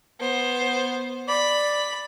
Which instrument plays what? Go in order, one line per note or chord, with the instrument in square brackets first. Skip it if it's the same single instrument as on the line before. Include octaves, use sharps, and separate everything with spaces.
[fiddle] B3 C5
[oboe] D5 [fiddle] B5